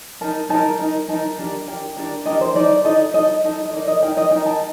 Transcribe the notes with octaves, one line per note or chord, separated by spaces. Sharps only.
D#4 A#4 A5
D#4 A#4 A5
D#4 A#4
D#4 A#4 A5
D4 G4 A#4
D4 G4 A#4 G5
D4 G4 A#4
D4 G4 A#4 D#5
C5
D#4 A4 D5
D#4 A4 D#5
D#4 A4 D#5
D#4 A4
D#5
D#4 A#4 D5
D#5
D#4 A#4 G5
D#5
D#4 A#4 G5
A5